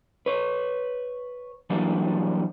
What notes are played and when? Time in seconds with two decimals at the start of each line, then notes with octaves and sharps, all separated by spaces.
0.26 B4 C#5
1.70 E3 F#3 G3 A#3 D4